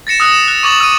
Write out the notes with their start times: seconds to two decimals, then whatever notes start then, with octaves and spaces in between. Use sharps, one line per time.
0.07 A6 A#6 C#7 E7
0.20 D#6 E6 F#6
0.32 E7
0.48 F#6
0.63 C#6 D6 A6 F#7
0.80 E6 D#7